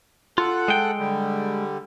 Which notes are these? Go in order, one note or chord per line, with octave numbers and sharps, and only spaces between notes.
F4 A4 F#5
G#3 G5
D3 G3